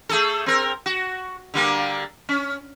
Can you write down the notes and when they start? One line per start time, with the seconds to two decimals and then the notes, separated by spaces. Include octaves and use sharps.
0.09 A3 G#4 A4
0.46 C4 A#4
0.86 F#4
1.54 D3 G3 A#3
2.29 C#4